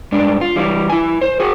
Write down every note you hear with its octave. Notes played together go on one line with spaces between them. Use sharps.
G2 G#3 D4
F4
E3 G3
E4 G#5
C5
F#4 G#4